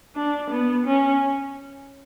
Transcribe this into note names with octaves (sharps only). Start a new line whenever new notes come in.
D4
B3
C#4